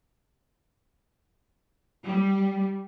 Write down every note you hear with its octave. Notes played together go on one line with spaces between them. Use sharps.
G3